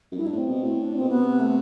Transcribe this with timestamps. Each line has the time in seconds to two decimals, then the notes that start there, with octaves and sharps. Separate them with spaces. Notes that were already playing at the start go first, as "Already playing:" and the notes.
0.12 F#2
0.17 G2 E4
0.27 D4
0.32 A2
0.37 C4
0.48 B2
0.63 A2
0.83 D4
0.96 B2 C4
1.09 C3 B3
1.40 A3